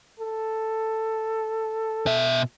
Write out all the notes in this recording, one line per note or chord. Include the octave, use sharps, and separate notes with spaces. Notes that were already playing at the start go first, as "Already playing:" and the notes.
A4
B2 E5